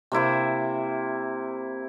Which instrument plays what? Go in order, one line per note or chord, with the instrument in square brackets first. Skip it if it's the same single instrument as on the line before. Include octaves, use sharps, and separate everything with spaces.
[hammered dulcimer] C3 A#3 E4 C5